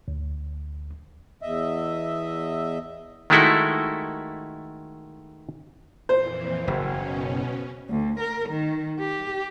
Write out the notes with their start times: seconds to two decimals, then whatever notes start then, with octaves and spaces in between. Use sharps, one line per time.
0.08 D2
1.41 E2 D#5 E5
3.30 D#3 G#3 A3 E4 F#4 A4
6.09 F2 A#2 E3 C5
6.67 F#1 B2 C#4
7.89 D2
8.20 A#4
8.49 D#3
8.99 G4